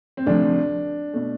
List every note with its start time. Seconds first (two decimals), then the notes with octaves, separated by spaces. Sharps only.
0.17 C4
0.26 D2 C3 F3 A3 D4
1.13 B2 A3